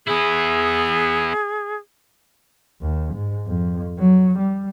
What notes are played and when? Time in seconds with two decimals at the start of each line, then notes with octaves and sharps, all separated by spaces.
0.07 B3 E4 G#4
2.82 D#2
3.15 G#2
3.47 F2
3.99 F#3
4.39 G3